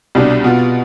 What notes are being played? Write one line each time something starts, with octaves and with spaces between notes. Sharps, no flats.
C2 B2 G3 D4
B2 B3 F4